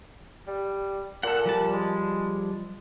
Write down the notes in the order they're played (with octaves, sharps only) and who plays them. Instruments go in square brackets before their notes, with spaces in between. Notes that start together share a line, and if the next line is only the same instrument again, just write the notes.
[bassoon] G3
[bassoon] A#2 [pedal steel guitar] A4 F#5
[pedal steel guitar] F3 G3 A5
[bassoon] G#3